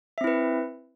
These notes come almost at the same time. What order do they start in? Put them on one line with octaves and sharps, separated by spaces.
E5 C4 E4 B4